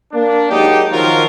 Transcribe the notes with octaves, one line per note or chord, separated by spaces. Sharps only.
A#3 D4
F#3 G#3 D#4 G4
D#3 F3 F#3 F4 A#4